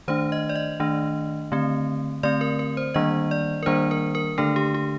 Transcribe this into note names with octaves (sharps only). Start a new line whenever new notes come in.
D#3 A3 D4 C5
D#5
D5
D#5
D#3 A3 D4
D3 A3 C4
D3 A3 C4 D5
A#4
A#4
C5
D#3 G3 A#3 D4 D#5
D5
A#4
D#3 G3 A#3 D4 C5
A#4
A#4
D3 A3 D4 A4
G4
G4